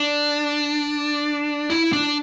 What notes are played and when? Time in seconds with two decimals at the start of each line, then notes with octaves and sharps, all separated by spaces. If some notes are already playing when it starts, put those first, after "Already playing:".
Already playing: D4
1.70 E4
1.93 D4